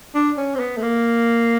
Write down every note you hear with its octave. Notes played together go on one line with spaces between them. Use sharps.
D4
C#4
C4
B3
A3
A#3